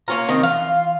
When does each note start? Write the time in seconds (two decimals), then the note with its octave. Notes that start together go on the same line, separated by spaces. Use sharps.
0.08 A#3 C#4 F4 A#5
0.29 D#3 C4 C#4 D#5
0.43 E3 F4
0.61 F5